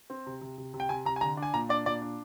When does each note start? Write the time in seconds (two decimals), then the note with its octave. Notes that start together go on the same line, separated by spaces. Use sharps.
0.10 C4
0.26 C3
0.41 C3
0.58 C3
0.74 C3
0.80 G5
0.89 C3 G#5
1.05 C3 A#5
1.16 G#5
1.21 D3 A#5
1.37 D4
1.43 G#5
1.54 A#2 A#5
1.69 D4 D5
1.86 A#2 D5
2.02 D4